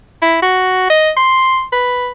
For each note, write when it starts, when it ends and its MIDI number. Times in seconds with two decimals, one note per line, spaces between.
0.22 0.37 64
0.42 0.90 66
0.90 1.11 75
1.17 1.64 84
1.73 2.10 71